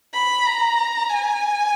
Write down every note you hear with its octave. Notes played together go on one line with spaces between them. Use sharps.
B5
A#5
G#5